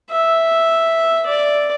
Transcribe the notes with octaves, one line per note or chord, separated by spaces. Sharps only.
E5
D5